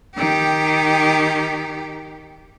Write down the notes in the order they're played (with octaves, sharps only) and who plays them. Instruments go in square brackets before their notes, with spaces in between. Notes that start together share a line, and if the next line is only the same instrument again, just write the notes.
[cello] D#3 G4